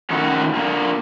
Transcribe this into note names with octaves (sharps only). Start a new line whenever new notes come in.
D#3 A3 C#4 F#4 A#4 C#5
D3 A#3